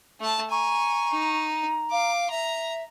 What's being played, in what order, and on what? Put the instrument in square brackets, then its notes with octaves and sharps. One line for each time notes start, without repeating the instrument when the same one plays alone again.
[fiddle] A3 A5
[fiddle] G#5 [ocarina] A#5 [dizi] C#6
[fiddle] D#4
[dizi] F5 [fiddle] D6
[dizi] E5 [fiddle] A#5